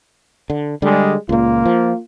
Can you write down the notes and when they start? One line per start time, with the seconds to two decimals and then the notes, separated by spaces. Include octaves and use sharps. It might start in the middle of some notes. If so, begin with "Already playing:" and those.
0.50 D3
0.82 D3 G3 G#3
1.29 C#2 A#2 A#3 F4
1.66 F3